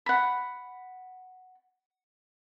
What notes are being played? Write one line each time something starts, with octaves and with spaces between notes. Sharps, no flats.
F#5 B5